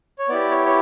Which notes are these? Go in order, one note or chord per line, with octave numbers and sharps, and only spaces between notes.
C#5
B3 E4 G4 D5
C#5
C#5